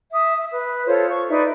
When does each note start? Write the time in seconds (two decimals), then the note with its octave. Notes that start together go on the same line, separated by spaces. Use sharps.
0.14 E5 D#6
0.37 E5
0.52 B4
0.87 F4 A4 C5 C#5
1.10 C#6
1.29 D#4 B4 D5 E5